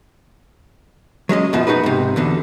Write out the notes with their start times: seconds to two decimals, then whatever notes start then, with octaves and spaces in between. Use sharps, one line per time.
1.29 F#3 G#3 C#4 D#5
1.53 F#2 B2 F3
1.67 D#4 F#4 G#4 B4
1.84 G#2 C3
2.16 E2 B2 D3